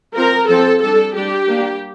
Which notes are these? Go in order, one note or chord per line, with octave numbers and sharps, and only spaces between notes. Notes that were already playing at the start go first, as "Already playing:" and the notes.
F3 C4 A#4
F3 C4 A4
G3 D4 A4
G3 D4 G4
G3 A#3 D4